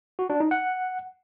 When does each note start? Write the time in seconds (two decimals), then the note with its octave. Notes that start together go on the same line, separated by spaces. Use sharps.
0.19 F#4
0.30 D4
0.40 D#4
0.51 F#5